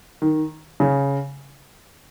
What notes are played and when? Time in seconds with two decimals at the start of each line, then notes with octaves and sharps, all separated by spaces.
0.22 D#3
0.80 C#3